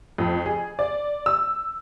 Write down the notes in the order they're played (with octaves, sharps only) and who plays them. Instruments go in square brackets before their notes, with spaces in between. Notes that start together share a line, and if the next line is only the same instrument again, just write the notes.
[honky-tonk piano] F2
G#4
D5
E6